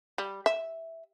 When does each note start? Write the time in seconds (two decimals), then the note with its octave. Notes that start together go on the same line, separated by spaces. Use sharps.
0.18 G3
0.46 E5